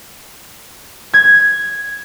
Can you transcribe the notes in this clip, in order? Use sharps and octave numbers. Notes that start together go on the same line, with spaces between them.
G#6